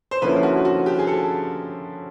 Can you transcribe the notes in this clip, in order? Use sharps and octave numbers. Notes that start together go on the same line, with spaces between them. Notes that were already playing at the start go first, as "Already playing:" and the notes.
C5
D3 F3 A#3 C#4 E4 B4
F#4
F#4
G4
G#4
A4